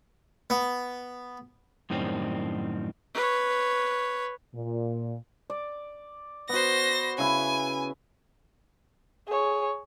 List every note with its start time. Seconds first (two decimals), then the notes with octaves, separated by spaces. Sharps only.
0.50 B3
1.90 F#2 A2 D#3 G3 C4
3.15 B4 C#5
4.55 A#2
5.50 D5
6.49 B3 F#4 C5 A#6
7.18 C#3 E4 G#5 B5
9.27 G#4 C#5